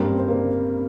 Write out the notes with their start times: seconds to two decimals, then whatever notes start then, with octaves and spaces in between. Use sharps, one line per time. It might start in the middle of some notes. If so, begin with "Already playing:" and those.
Already playing: G2 G3 A#3 C4 A#4
0.18 C5
0.28 A#3 A#4